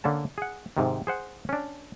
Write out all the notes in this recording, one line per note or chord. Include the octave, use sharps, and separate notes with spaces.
D3 A#3 C#4 A5
G#4 F#5
G#2 C3 D#3
G#4 C5 F#5
C#4 D4